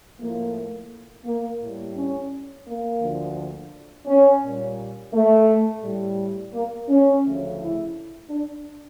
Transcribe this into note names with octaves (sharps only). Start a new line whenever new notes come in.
A2 F3 A3 A#3
A#3
A2 G3
C#4
A#3
D2 D3 F3
C#4
A#2 G3
A3
A2 G3
A#3
C#4
D2 C#3 F3 A3
E4
D4